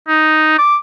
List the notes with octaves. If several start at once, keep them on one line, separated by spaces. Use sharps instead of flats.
D#4
D6